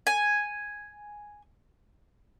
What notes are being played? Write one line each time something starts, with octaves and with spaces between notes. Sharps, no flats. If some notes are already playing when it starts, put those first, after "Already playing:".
G#5